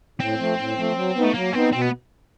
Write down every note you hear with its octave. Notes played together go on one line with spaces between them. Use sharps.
A2 C4
F3 A3
A2
F3 A3
F#3
B3 D#4
A3
F#3 A#3
B3 C4 D#4
B2 C4
B3